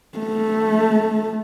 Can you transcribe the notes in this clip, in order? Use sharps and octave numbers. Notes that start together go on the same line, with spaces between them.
A3